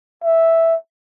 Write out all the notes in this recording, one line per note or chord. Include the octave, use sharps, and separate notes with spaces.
E5